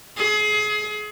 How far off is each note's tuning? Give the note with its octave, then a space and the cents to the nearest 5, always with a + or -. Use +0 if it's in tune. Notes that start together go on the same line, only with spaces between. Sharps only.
G#4 +30